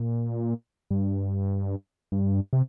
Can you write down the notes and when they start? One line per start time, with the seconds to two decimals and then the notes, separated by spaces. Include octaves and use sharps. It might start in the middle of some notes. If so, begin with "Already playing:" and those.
Already playing: A#2
0.91 G2
2.12 G2
2.53 C3